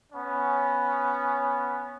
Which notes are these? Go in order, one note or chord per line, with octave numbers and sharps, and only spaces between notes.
B3 C#4